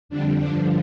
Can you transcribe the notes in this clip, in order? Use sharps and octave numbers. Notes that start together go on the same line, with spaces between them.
F2 D3 G3 D4
G2 D3 F3 D4